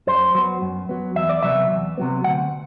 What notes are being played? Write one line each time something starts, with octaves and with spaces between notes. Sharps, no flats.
F#2 C5
F#3 B3
F#2
F#3 B3
E2 E5
D5
C3 F#3 B3 E5
E2
C3 F#3 B3
D2 F#5